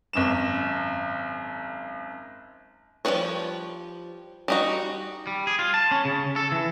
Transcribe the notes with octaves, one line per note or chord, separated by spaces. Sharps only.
G#1 F#2 E7
F3 G3 C#4 B4 C#5
G3 D#4 F#4
G3
G#4
F4
A5
C#4
C#3
A4
E3